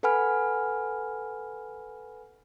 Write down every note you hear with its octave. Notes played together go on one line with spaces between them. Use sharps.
A4 B4 F#5 G#5 B5 F6